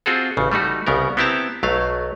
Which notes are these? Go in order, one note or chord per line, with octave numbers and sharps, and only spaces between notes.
C4 F4 F#4 G#4 A4
A1 C#3
G3 A3 D#4 F#4
C2 C#3 B3 A#4
B3 C4 E4 G4 A5 A#5
B1 F#3 A3 F5